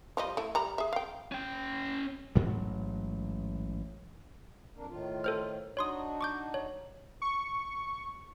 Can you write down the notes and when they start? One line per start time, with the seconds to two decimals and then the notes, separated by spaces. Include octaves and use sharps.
0.17 F3 G3 D#5
0.37 A3 E4
0.55 G3 A#5 B5
0.78 G#4 E5
0.93 F5 G5
1.32 C#4 G5
2.36 A1 G#2 F#3
4.76 F2 A#3 D4
4.90 A2 D#3 F4
5.24 A4 C5 F6
5.77 D4 D#4 F#4 C#5 C6 D#6
6.21 C#6 D6 G6
6.54 C#5
7.22 C#6